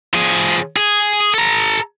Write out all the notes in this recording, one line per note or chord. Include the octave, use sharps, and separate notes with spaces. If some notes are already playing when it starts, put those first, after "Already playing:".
F3 G#4
G#4
A4 A#5